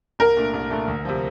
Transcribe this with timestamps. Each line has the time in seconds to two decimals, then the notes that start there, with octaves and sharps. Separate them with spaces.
0.19 C2 A#4
0.37 A#2 A3 D4
0.54 C2
0.70 A#2 A3 D4
0.88 D2
1.05 C3 F3